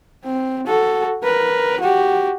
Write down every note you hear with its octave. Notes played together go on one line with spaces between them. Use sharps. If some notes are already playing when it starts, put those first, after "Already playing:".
C4
F#4 A4
A#4 B4
F#4 G4